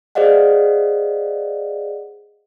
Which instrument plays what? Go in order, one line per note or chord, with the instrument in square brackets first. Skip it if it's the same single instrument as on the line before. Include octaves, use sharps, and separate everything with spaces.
[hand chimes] G#4 C5 D5 D#5 F5 F#5